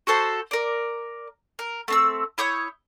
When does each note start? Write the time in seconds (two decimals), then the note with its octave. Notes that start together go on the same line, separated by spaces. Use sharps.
0.07 F#4 A4 C5 A5
0.51 A#4 D5
1.59 A#4
1.88 A3 C4 E6
2.38 E4 C#5 D#6 G6